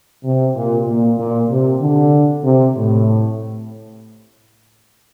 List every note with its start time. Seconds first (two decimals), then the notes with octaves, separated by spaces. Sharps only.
0.24 C3
0.55 A#2
0.87 A#2
1.18 A#2
1.50 C3
1.81 D3
2.44 C3
2.76 A2